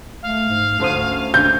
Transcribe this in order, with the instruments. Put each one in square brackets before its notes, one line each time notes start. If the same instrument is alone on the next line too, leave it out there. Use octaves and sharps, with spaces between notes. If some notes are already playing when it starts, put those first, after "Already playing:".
[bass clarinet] A3 [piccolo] F5
[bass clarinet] G#2
[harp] D2 C5 D#6 [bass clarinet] C#4
[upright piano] G6